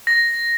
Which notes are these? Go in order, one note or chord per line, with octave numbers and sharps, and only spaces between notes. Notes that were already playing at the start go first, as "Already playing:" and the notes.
A#6